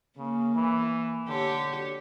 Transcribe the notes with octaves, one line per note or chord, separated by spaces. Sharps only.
C#3 A#3
E3
D3 G4 C#5